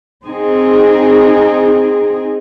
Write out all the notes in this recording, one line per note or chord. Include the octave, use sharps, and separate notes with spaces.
C4 D#4 G#4